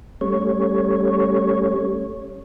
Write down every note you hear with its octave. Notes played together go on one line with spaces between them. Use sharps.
G3 A3 C#4 C#5